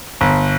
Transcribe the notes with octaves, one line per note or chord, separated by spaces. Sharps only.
G1